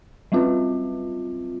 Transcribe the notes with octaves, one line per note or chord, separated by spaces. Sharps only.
F#3 G3 C4 F4